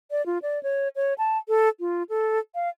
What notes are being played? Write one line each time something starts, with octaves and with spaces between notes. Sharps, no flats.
D5
F4
D5
C#5
C#5
A5
A4
F4
A4
F5